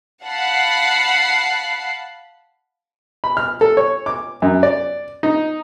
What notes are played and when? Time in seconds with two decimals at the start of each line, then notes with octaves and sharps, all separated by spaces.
0.24 F5 F#5 A5 B5 F#6 C7
3.24 B5
3.37 F6
3.61 A4
3.77 C#5
4.06 D6
4.42 F#2
4.63 D5
5.23 D#4